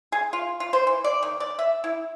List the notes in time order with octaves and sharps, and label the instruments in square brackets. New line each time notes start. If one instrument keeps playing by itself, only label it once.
[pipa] G#4
F4
F4
C5
E3
D5
D#3
D5
E5
E4